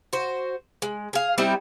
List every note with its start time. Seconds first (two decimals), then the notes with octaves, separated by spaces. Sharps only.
0.13 F#4 C5
0.82 G#3
1.13 G#4 F5
1.38 G3 C4 D#4 E4